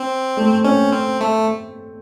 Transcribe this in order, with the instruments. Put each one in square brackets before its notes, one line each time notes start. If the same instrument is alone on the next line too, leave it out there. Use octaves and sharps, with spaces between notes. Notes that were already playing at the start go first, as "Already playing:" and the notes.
Already playing: [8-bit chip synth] C4
[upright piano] A3
[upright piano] C4 [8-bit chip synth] C#4
[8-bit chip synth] C4
A3